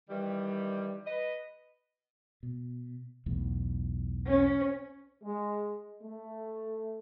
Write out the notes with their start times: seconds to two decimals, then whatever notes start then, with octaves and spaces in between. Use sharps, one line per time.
0.10 D#3 E3 G3
1.06 B4 D#5
2.43 B2
3.26 B1 E2 A2
4.27 C#4
5.24 G#3
6.03 A3